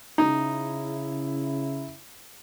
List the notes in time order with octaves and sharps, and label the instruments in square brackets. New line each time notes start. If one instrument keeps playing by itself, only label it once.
[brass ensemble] C#3 E4 [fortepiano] D#4